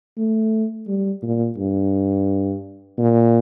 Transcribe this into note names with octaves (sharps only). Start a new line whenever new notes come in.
A3
G3
A#2
G2
A#2